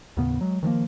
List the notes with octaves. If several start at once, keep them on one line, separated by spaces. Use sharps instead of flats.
D#2 A2 C#3 B3
F#3 G#3
D#3 F3 G#3 A#3